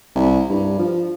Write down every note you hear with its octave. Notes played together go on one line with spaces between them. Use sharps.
C2
G2
F3